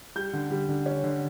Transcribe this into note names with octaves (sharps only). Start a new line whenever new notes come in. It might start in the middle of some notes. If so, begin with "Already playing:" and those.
G3 G6
D3
G3
D3
C#4
D3